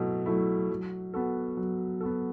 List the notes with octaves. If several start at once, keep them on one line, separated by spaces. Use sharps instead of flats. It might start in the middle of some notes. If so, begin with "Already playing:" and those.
Already playing: B2 F#3 A3 E4
F#3 A3 E4
F#3
B3 F#4 A4
F#3
B3 F#4 A4